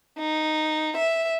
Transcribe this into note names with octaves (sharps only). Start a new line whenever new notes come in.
D#4
E5